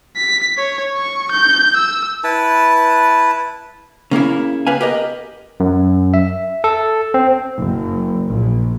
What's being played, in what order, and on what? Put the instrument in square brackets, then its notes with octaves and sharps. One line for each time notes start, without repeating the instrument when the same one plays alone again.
[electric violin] B6
C#5
C#6
G6
E6
[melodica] E4 B4 A5
[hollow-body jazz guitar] C#3 A#3 C#4 E4
A#3 B4 F5 G#5
G4 A#4 B4 D#5
[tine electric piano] F#2
E5
A4
C4
[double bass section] F#1
A#1